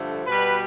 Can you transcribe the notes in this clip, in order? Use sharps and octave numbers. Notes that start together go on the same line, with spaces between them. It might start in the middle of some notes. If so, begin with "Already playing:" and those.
Already playing: G2 D3 F3 A3
B2 G3 B4